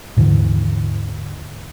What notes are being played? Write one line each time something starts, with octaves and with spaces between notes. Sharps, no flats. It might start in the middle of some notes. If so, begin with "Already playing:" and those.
D#2 G#2 D3 E3